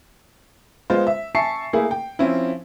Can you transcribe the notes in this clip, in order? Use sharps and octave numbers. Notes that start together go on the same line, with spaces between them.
G#3 B3 F4 C5
E5
E5 G#5 A5 C#6 C7 C#7
A3 A#3 E4 G#4
G5
F3 C4 C#4 E4